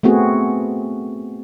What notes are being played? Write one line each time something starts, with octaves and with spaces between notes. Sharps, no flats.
A3 B3 C4 F#4 G#4